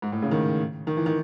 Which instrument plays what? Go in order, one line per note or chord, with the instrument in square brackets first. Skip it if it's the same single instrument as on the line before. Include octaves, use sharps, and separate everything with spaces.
[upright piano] G#2
A2
C#3
D#3
D#3
E3
D#3